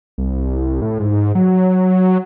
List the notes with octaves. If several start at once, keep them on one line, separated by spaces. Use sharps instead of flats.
C2
A2
G#2
F#3